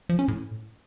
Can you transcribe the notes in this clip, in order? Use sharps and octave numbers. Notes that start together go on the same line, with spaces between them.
F3
C#4
A2